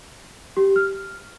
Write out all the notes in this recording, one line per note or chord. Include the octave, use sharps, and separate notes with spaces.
G4
F6